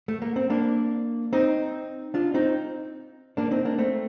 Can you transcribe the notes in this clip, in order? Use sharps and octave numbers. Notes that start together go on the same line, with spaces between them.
A3
A#3
C4
A#3 D4
C4 D#4
D4 F4
C4 D#4
A#3 D4
C4 D#4
A#3 D4
A3 C4